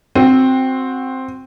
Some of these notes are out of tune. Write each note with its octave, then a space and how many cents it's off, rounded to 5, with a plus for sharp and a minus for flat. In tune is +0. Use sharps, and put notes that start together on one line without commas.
C4 +0 F#4 -15